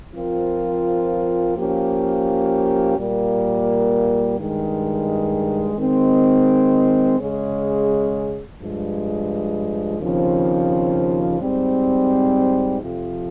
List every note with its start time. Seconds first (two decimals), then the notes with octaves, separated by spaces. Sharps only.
0.16 F3 C4 F4 A#4
1.57 F3 A#3 C#4 G4
2.97 A#2 G3 A#3
4.37 G2 D#3 G#3
5.77 D#3 G#3 C4
7.18 C#3 G#3 C#4 G#4
8.59 G2 F3 G#3
9.99 D#2 C#3 F3 C4
11.40 G#2 G3 C4
12.80 F2 C3 F3